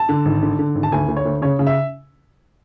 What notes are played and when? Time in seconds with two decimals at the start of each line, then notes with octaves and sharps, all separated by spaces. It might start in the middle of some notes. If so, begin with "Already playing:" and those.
Already playing: A5
0.09 D3
0.25 G#1
0.43 D3
0.59 D3
0.75 G#1
0.83 A5
0.92 D2 G#5
1.08 D2
1.17 C#5
1.25 D2
1.42 C#3 C#5
1.59 C#3
1.67 E5